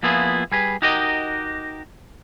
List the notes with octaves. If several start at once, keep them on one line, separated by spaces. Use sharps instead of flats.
F3 A#3 B3 E4 F4 G#4
G3 G#4 B4
D#4 F#4 G4 A#4 D#5